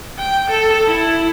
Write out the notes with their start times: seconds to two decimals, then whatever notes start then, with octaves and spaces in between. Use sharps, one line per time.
0.19 G5
0.50 A4
0.87 E4